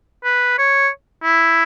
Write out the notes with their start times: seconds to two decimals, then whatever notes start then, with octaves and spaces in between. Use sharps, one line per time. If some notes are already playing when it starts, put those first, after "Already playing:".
0.24 B4
0.58 C#5
1.24 E4